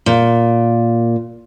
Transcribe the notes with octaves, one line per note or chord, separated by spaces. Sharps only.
A#2